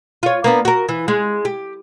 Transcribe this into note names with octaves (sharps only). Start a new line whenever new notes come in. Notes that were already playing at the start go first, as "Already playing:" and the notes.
F4 C#5
A#3 B3 D4
F#4 A#4
E3
G#3
G4